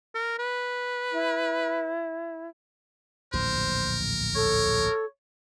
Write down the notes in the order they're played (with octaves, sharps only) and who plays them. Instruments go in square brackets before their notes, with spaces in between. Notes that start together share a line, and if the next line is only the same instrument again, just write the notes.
[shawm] A#4
B4
[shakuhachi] E4
[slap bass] D1 A#1 E2 [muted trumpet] A#4 [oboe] C5
[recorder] A4 [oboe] C#5